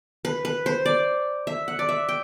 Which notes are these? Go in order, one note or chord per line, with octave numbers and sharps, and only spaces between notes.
B4
B4
C5
D5
E5
F#5
D5
E5
G5